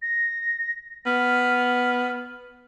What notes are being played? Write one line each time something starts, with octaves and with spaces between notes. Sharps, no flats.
A#6
B3 F6